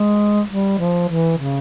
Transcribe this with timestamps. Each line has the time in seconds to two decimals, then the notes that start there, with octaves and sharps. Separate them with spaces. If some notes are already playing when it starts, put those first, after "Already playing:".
Already playing: G#3
0.49 G3
0.79 F3
1.08 E3
1.38 C#3